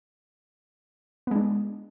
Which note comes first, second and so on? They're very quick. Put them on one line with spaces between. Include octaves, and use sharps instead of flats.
B3 G#3 D4